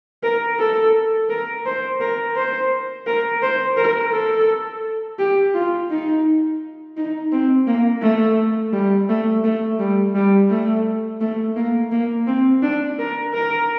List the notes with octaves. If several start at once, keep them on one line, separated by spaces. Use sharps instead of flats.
A#4
A4
A#4
C5
A#4
C5
A#4
C5
A#4
A4
G4
F4
D#4
D#4
C4
A#3
A3
G3
A3
A3
G3
G3
A3
A3
A#3
A#3
C4
D4
A#4
A#4